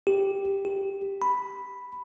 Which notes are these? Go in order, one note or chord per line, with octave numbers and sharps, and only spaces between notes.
G4
G4
B5